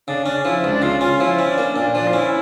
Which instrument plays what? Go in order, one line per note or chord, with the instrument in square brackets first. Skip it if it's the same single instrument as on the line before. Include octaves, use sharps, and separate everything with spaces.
[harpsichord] C#3 [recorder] D4
[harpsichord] C#4 [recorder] D4
[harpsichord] F3 [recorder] E4
[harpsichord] C#2 [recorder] D4
[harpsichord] C#3 [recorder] F4
[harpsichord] C#4 [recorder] F4
[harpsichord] F3 [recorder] E4
[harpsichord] C#4
[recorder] D4
[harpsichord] A#3
[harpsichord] A#2 [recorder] D4
[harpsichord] F3 [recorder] D4
[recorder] F4
[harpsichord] C#4 [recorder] E4